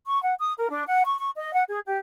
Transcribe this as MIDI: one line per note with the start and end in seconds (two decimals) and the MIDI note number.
0.05 0.17 85
0.22 0.33 78
0.39 0.53 87
0.57 0.68 70
0.69 0.83 62
0.87 1.02 78
1.04 1.16 85
1.17 1.29 85
1.35 1.54 75
1.54 1.64 78
1.68 1.79 68
1.86 1.97 67